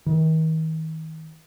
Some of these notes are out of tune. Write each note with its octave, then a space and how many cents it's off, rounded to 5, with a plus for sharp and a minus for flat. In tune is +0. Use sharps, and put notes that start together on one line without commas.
D#3 +40